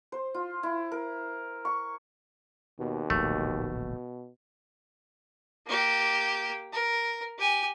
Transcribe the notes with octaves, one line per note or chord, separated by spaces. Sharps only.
C5
F4
E4
A#4
C#6
D#2 B2
D1 A#1 B2 A3
A#3 G4
A#4
G4 G#5